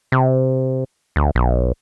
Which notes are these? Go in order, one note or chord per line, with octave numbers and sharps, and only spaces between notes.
C3
D2
B1